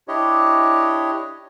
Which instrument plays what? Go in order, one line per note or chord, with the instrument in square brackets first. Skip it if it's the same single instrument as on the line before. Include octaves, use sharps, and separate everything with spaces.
[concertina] D4 E4 G4 C#5 D#5